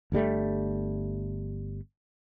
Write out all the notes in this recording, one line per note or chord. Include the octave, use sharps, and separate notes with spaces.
G1 G2 G3 A3